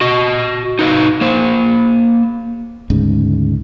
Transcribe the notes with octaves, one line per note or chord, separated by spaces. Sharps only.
F#4 D#5
D#4 B4 D#5 F5
A#3 C5
D2 G#2 C#3